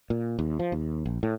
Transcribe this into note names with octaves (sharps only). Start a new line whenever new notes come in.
A#2
D#2
F3
D#2
A#1
A2